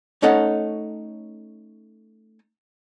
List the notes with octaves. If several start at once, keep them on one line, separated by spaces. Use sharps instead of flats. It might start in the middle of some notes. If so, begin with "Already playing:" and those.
A3 C#4 D#4 A4 C#5 F#5